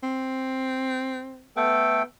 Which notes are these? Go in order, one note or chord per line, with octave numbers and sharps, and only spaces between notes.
C4
A3 B3 A4 G5